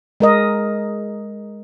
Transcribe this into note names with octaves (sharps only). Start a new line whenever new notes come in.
G#3 A#4 D#5